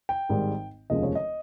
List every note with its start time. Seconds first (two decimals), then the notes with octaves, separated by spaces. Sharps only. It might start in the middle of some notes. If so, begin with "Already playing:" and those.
0.09 G5
0.29 G#1 G#2 D#3 G3
0.90 F1 D#2 C#3 F3 G#3 D#5
1.03 C#5
1.15 D#5